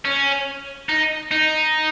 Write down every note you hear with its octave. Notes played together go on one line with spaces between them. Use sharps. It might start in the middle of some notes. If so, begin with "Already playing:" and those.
C#4
D#4
D#4